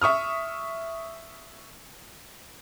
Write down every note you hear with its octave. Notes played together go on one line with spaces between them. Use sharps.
E5 C#6 D#6 F6